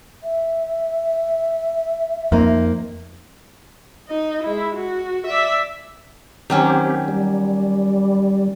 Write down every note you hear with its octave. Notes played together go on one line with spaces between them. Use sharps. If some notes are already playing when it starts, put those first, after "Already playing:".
E5
F2 A#3 C4 D#4
D#4 D#5
G#3 E4
F#4
D5 E5
D#3 F#3 C4 C#4 G4
G3